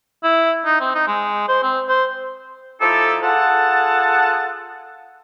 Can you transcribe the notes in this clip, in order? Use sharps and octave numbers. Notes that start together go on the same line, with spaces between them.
E4
D#4
C4
D#4
G#3
C5
C4
C5
F3 D#4 E4 G4 A4
F4 G#4 A4 F#5 A5